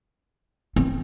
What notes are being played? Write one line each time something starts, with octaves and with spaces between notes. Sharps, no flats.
C4